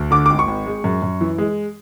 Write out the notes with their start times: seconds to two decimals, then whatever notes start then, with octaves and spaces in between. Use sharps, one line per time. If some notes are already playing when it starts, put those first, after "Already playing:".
Already playing: D2
0.11 D3 D6
0.26 G#1 D6
0.39 C#6
0.48 G#1
0.66 G#3
0.84 F#2
1.02 F#2
1.21 E3
1.38 G#3